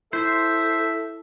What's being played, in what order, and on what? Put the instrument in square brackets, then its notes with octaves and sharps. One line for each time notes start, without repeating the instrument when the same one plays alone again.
[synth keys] E4 [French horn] A4 [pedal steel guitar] C5 [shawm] E5